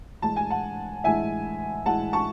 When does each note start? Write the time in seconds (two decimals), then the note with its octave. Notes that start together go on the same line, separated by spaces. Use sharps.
0.22 A2 E3 G#3 A5
0.36 G#5
0.50 F#5 A5
1.04 A2 E3 G#3 E5 G#5
1.86 A2 E3 G#3 F#5 A5
2.13 A5 C#6